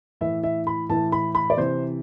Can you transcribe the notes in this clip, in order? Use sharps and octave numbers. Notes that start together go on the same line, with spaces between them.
A2 E3 E5
E5
B5
A2 E3 A5
B5
B5
D5
C3 E3 C5